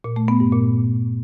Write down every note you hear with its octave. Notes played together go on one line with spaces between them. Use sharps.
A#2
A3
B3
G2
A#2